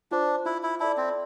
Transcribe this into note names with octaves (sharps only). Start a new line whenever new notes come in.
D4 F4 C5
E4 F4
E4
E4 A4 D5 A5
C4